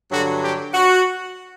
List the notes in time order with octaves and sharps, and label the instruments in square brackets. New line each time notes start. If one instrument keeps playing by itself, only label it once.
[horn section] G2 D3 F#3 F#4
G4
F#4